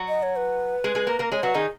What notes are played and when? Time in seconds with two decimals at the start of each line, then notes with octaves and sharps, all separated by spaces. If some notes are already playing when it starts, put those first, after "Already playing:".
Already playing: F#3 F#4
0.08 D#5
0.23 C#5
0.36 B4
0.84 G#3 G#4
0.95 G#3 G#4
1.07 A#3 A#4
1.19 A#3 A#4
1.31 G#3 G#4 C#5
1.43 F#3 F#4 B4
1.54 D#3 D#4 G#4